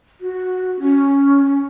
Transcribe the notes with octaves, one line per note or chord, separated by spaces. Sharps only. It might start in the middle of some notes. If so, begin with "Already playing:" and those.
F#4
C#4